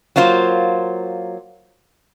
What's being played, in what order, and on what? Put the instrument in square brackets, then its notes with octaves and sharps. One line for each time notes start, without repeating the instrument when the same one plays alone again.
[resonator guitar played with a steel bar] F#3 A#3 F4 C5